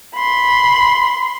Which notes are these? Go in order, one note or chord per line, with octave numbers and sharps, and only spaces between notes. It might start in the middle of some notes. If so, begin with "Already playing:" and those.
B5 C6